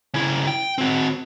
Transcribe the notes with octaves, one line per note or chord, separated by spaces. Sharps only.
C#3 E4
G5
C4 F#4